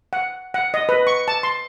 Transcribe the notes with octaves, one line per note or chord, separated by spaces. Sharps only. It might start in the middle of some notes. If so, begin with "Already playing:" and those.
F#5
F#5
D#5
B4
C#6
A5
C6